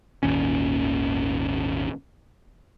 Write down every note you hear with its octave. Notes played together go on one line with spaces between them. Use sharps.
G#1 D#2 A#2 C#4